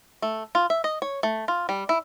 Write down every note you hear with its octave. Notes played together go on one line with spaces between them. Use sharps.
A3
F4
E5
D#5
C#5
A3
F4
G3
E4